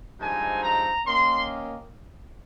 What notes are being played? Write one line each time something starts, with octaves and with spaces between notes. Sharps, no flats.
G2 F3 G#3 C4 D#4 G#5
A#5
D#3 A#3 C#4 C6